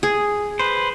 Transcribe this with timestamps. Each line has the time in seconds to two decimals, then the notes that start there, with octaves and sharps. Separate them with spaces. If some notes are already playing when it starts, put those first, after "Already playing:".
0.03 G#4
0.59 B4 C5